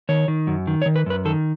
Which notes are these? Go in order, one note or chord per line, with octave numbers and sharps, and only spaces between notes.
D#3 C#5
D#3
F#2
D#3
C#5
D#3
B4
F#2 B4
D#3 A4